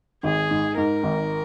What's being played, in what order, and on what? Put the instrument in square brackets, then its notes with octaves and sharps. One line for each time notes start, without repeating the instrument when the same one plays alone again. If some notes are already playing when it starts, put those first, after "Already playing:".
[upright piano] G#1 [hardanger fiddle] G#4
[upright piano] G#2
[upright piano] G#2 [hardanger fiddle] A#4
[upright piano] G#1